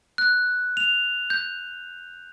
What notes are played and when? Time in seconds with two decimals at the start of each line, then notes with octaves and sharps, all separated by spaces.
0.18 F#6
0.77 F7
1.30 G6